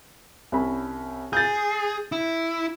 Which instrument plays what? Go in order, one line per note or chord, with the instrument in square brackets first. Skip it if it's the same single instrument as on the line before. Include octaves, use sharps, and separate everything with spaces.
[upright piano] C2 C#4 B5
[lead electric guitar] G#4 [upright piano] G6 A6
[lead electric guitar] E4